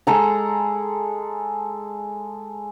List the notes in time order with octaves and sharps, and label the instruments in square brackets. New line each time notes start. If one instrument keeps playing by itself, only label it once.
[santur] G#3 A4 A#5